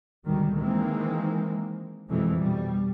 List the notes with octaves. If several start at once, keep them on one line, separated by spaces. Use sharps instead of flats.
D2 G#2 B2 D#3 G3
D#3 E3 G#3 A#3 C4
F2 B2 E3 G#3
B2 G3